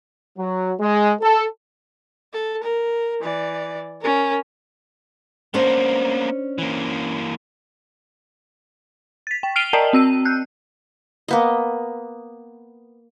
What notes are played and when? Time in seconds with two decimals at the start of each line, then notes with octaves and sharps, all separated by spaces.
0.38 F#3
0.80 G#3
1.21 A4
2.33 A4
2.63 A#4
3.21 E3 D5
4.01 C#4 A#4
5.54 A#3 B3 C#4 D4 C5
6.58 E3 A#3
9.27 A6 B6
9.43 G5
9.56 F6 C7 D7 D#7 F7 G7
9.73 A#4 D5 D#5 G5 A5 A#5
9.93 C4 E6 D#7
10.25 F#6 G6
11.28 A#3 B3 D#5